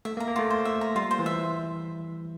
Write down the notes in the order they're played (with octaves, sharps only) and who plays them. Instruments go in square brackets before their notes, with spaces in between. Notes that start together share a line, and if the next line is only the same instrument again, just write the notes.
[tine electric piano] A3 [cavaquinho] E5
[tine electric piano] A#3
[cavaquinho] A#5
[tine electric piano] A#3
[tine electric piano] A3 [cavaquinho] F4
[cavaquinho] C5
E5
A#5
[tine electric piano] G3 [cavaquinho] F4
[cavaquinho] C5
[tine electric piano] E3
[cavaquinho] E5